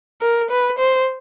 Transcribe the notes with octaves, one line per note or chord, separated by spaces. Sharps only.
A#4
B4
C5